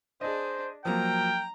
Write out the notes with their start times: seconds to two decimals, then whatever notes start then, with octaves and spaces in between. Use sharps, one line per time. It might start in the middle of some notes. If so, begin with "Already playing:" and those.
0.21 D4 G#4 C5 D#5
0.85 F3 F#3 A#3 A#4 G5 A#5